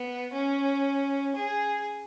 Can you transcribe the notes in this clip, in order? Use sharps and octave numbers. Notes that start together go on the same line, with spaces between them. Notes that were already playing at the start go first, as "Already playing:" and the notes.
Already playing: B3
C#4
G#4